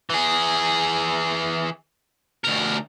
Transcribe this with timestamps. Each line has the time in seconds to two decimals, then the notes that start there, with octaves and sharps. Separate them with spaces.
0.10 E3 G#4
2.45 D2 A#4